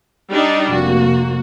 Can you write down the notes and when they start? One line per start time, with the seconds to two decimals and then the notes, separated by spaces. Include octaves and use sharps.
0.32 G3 D4 D#4
0.71 F1 A#3 F#4